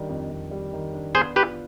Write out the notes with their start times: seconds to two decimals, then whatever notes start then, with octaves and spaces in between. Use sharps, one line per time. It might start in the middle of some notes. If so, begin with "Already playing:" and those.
Already playing: D#3 G3 D4
0.09 F2
0.30 F2
0.51 G3
0.73 D#3
0.94 D4
1.15 B3 G#4 C5
1.36 F4 G4 B4